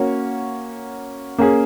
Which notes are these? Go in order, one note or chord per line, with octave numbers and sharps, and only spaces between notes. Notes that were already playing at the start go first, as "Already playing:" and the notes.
Already playing: A#3 C#4 F#4 C#5
A#3 C#4 G#4